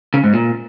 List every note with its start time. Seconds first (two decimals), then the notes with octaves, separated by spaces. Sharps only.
0.14 C#3
0.24 G#2
0.34 A#2